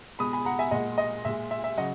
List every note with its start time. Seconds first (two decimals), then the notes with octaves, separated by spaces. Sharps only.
0.19 B2 G#3 B5 D#6
0.33 G#5 B5
0.45 F#5 A#5
0.59 E5 G#5
0.71 A#2 G#3 D#5 F#5
0.98 D#5
1.25 A#2 G#3 E5
1.51 E5
1.64 E5
1.77 C#3 F#3 D#5 F#5